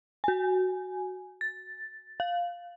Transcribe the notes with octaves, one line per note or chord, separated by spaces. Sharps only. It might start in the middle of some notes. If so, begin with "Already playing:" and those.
F#4 G#5
A6
F5